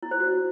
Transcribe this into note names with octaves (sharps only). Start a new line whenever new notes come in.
E4
C5
F#4